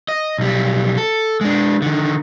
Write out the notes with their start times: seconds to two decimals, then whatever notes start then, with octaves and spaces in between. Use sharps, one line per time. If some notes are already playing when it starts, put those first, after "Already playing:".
0.08 D#5
0.38 B1 G3
0.98 A4
1.41 G#3 D4
1.82 D3 D#3